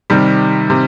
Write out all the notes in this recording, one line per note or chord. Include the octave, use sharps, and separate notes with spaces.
C3 D#3 G3
C3